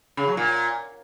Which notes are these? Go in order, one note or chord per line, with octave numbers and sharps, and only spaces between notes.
C#3
F#3
A#2